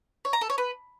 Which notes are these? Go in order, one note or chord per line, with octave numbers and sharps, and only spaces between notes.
C#5
A#5
A4
C#5
B4